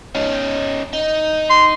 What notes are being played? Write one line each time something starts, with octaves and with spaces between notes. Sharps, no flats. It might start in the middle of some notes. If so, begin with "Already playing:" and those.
C#4 D#4
D#4
C6